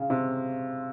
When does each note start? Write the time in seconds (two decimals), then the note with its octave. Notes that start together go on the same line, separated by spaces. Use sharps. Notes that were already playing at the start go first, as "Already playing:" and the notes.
Already playing: C#3
0.10 C3